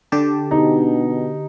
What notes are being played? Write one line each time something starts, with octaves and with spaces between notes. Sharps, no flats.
D3 G4 A5
B2 D#4